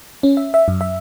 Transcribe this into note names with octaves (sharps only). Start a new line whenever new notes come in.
C#4
E5
E5
F#2
E5